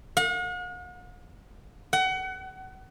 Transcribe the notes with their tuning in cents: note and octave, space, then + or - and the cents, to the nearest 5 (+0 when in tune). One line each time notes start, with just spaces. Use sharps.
F#5 -45
F#5 +30